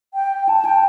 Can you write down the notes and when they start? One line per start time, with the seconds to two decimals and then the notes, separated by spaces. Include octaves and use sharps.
0.14 G5
0.49 A5
0.65 G5